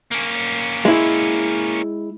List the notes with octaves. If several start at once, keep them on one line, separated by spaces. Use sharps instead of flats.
A#3 C#4
G#3 E4